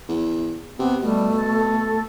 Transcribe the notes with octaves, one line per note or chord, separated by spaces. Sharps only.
E2
C3 B3
B2 G3 A3
A4